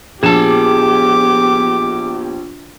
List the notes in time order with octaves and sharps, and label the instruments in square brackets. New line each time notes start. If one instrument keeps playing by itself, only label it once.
[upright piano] A#1 E7 [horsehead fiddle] B3 G4 [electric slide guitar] G#4 A5 [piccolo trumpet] D6